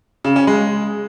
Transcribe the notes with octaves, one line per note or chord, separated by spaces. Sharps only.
C#3
C#4
G#3